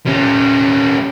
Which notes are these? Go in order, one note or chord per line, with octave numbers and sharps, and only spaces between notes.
G3 C#4